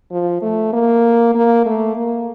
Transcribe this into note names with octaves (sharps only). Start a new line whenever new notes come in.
F3
A3
A#3
A#3
A3
A#3